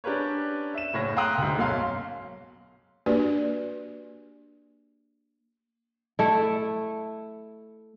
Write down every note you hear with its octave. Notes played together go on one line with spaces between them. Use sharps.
C#4 D4 G4 A#4 B4 C#5
E5 E7
F#1 A2 C#5 A#6
F5 G5 A#5 C6 D#6 F#6
D2 G#2
B1 F#2 C#4 F5 C6
A#3 D4 F#4 G4 B4 D5
A3 E4